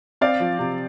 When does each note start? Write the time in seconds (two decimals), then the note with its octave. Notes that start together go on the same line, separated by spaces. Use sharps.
0.21 C4 D5 F5
0.40 F3
0.59 C3